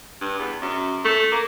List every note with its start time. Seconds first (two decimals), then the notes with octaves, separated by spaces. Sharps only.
0.21 G2
0.39 E2
0.62 F#2
1.05 A3
1.32 A#3